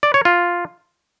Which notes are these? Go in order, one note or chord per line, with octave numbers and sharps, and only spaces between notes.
D5
C#5
F4